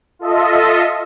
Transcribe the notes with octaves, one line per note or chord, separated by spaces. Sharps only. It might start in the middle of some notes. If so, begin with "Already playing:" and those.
F4 A4 D#5 E5